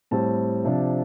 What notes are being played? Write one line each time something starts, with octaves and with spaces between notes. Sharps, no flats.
A2 G3 C4 A5
C3 F3 D4